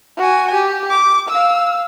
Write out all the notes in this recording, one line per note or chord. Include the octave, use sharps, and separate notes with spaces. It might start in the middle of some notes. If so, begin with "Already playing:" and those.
F#4 G#5
G4
D6
F5 E6